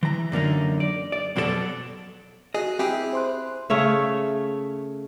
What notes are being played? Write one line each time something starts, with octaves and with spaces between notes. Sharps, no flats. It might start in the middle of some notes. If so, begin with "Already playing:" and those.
E3 A#5
F#2 D3 A#3 D#4
D5
D5
F2 B2 F#3 C#4 A4 D5
F#4 G#4 D#5
C4 E4 G4 G#4
C5 C6 F#6
C#3 A3 C#5 E5